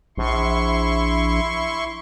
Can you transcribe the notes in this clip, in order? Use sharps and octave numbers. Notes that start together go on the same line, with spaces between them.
A#1 E4 C6 C#6